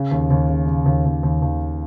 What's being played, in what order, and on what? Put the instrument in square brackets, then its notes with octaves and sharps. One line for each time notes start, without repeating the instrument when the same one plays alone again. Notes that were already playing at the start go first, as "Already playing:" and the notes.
Already playing: [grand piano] C#3
D#2
D#2
C#3
C#3
D#2
D#2
D#2
D#2